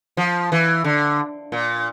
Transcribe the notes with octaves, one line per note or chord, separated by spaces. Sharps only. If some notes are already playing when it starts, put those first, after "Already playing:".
F3
E3
D3
A#2